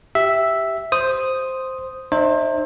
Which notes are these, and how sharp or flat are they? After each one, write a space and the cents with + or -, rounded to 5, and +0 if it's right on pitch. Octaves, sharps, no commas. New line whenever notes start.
G4 -5 E5 +0
C5 +0 D#6 +0
D#4 -40 C5 +30 E5 -15